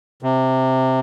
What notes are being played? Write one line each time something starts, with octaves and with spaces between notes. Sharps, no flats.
C3